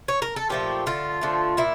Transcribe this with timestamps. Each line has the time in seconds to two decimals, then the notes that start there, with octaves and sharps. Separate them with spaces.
0.08 C#5
0.22 A#4
0.36 A4
0.49 A#2 F3 A3 G4
0.86 D3 A3 F4
1.21 D3 F3 A3
1.57 A#2 E4